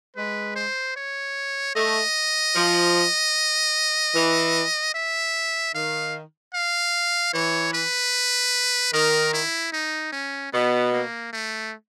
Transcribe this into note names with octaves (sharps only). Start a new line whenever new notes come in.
G#3 B4
C5
C#5
A3 D#5
F3
E3
E5
D#3 F5
F5
E3 C#5
B4
D#3 A#4
E4
D#4
C#4
B2 B3
A#3
A3